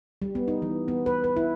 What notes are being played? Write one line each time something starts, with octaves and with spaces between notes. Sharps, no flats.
G3
B3
D#4
E3
B3
B4
B4
E4